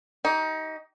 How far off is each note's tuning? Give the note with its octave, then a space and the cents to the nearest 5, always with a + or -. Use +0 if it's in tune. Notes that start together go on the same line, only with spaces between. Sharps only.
D#4 +20 G4 -20